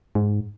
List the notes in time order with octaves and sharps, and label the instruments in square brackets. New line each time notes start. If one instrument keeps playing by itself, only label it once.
[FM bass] G#2